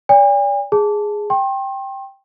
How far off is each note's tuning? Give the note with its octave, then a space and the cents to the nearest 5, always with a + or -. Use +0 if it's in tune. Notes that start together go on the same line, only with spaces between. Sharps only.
D5 -40 G#5 -45
G#4 +0 A5 +0
G5 +0 C6 +40